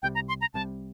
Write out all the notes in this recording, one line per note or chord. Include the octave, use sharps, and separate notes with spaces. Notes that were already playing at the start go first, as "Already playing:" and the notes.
C2 C3 G3 G5
A#5
C6
A#5
C2 C3 G3 A5